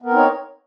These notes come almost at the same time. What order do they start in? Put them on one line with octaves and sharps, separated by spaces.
B3 A#4 C4 D#4 C#5